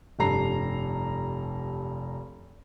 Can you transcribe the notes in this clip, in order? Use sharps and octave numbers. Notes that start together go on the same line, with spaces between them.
F1 G2 A4 A#5 C7